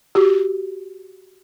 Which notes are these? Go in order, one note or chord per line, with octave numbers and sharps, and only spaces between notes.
F#4 G4